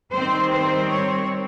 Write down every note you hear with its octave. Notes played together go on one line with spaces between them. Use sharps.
D#3 G3 C4 C5
C5
C#5